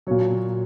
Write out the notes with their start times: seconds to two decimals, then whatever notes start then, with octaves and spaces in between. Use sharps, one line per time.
0.07 A#2 F#3 C#5